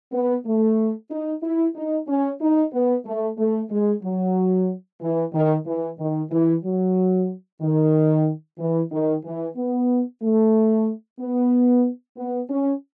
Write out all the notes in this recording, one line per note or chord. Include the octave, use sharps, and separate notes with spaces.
B3
A3
D#4
E4
D#4
C#4
D#4
B3
A3
A3
G#3
F#3
E3
D#3
E3
D#3
E3
F#3
D#3
E3
D#3
E3
B3
A3
B3
B3
C#4